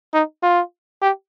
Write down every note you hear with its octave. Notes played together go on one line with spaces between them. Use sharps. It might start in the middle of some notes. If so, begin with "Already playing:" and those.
D#4
F4
G4